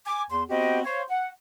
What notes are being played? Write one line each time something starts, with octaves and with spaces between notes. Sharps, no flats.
G#5 D6
E2 C6
B3 C4 F#4 G4 C5 D#5
C5 C#5 F5
F#5